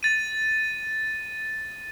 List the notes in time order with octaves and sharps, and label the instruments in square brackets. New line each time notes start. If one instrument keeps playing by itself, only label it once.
[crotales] A6 D#7